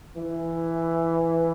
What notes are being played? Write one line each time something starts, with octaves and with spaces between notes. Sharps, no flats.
E3